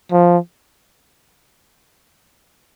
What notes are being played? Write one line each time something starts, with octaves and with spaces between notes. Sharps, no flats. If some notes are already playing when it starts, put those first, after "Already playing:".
F3